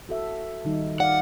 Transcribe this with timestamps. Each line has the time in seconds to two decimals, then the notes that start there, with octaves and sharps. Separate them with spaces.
0.09 F#4 A4 E5
0.65 D#3 G3 D#4
1.00 D5 F5 F#5